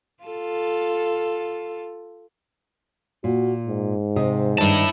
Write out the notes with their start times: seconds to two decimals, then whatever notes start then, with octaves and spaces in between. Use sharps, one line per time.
0.23 F4 A4
3.24 A#2 F#4
3.66 G#2
4.16 C3 D#5
4.58 G2 D#3 D#4 E4 A5